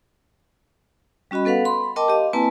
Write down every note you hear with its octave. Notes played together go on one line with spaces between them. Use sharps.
G3 C#4 F#4 D#5 B5
B3 A4 B4 F5 F#5
B5 C6
A#4 D#5 G5 A5 D6
G4 D#5 F5
A#3 C4 E4 B4 G#5 A5